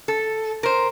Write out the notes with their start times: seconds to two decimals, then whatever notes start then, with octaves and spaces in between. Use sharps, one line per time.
0.08 A4
0.63 A#4 C5